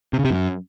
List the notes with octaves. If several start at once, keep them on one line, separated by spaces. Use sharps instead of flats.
C3
C#3
C3
F#2